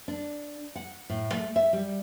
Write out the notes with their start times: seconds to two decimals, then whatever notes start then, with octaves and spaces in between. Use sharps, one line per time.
0.08 D4
0.75 F#5
1.09 A2
1.33 A3
1.56 E5
1.73 G3